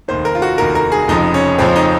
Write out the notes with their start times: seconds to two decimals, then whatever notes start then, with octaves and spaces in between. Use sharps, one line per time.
0.08 F1 D#2 D#3 C5
0.25 A#4
0.35 F4
0.42 F#4
0.58 F1 D#2 D#3 A#4
0.75 A#4
0.92 G#4
1.08 F1 F2 C#3 F3 D#4
1.34 C#4
1.58 F1 F2 C#3 F3 C4
1.76 D#4